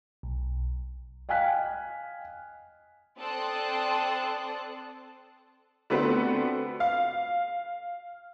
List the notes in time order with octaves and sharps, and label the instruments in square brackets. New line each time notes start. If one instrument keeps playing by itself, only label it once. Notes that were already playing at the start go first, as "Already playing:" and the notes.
[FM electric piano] B1
[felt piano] D#5 F5 G5 G#5 F#6 B6
[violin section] C4 A4 D5 C6 D#6 F#6
[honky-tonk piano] D3 A3 B3 C4 F#4 B4
F5